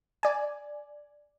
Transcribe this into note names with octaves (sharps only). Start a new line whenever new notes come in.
D5 G#5